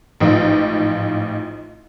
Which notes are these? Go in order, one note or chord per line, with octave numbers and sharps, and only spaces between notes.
A1 G#2 F3